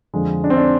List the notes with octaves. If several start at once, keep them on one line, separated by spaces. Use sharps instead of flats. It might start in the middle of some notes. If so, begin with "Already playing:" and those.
F2 D3 F3 G#3
D4
C4
D4